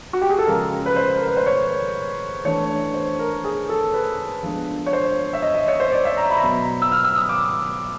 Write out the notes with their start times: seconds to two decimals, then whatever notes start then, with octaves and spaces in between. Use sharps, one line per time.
0.13 F#4
0.21 G4
0.30 G#4
0.39 A4
0.47 C#3 F3 G#3 C#4 A#4
0.86 B4
0.96 C5
1.17 A#4
1.27 B4
1.37 C5
1.46 C#5
2.45 E3 A3 D4 C#5
2.94 C5
3.19 A#4
3.44 G#4
3.69 A4
3.94 B4
4.43 F3 G#3 B3 D4
4.86 C#5
4.93 C5
5.33 E5
5.42 D#5
5.55 D#5
5.68 C#5
5.80 C5
5.92 D5
6.05 E5
6.17 A#5
6.30 B5
6.37 A#5
6.41 B2 F#3 B3 B5
6.82 E6
6.92 F6
7.04 E6
7.16 D#6
7.29 D6